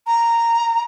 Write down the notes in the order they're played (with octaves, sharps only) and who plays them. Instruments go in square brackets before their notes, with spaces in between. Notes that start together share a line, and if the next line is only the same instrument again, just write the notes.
[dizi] A#5